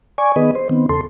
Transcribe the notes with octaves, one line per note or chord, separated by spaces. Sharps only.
D5 G#5 C#6
D#3 B3 G#4 B4 D#5
C5
D#3 B3 C4
E2 C#3 A4 C6